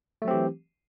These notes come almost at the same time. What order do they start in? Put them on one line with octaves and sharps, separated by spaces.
A3 F#3 C4 G4 E3